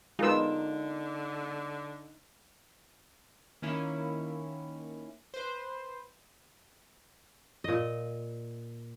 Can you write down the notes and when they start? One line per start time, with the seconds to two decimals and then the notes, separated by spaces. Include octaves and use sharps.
0.19 D3 G#3 B3 D#4 F4 A#4 E6
3.62 D#3 A#3 C#4 E4
5.34 B4 C5
7.64 A#2 D#5